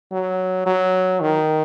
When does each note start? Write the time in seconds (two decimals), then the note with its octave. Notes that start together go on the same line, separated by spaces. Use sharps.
0.12 F#3
0.66 F#3
1.21 D#3